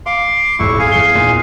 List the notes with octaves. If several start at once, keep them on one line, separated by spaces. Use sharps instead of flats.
F5 C6 D6
D#1 G#1 E2 E4 C#6
G#4 F5 G#5
E2 C#7 G7
E2 A#2 D#3